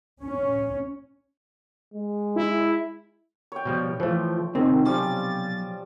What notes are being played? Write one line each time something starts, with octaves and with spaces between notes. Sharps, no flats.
C#4
G#3
E4
C#5 G5
B2 F3 G3
E3 F3 A3
C3 D#3 C4
B1 F3 G3 C#4 A6